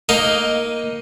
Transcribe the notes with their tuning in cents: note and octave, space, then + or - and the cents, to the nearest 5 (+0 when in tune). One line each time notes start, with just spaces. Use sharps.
A#3 +0 D#4 +10 D#5 +0